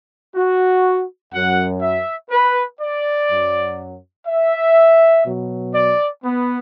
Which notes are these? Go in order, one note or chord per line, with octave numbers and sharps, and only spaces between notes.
F#4
F#2 F#3 F#5
E5
B4
D5
F#2 F#3
E5
B2 F#3
D5
B3